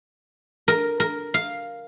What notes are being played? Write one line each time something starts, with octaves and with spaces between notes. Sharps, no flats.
A#4
A#4
F5